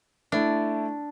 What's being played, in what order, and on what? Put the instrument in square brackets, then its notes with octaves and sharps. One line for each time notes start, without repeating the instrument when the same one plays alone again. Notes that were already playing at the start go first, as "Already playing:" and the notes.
[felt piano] A3 E4 [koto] D4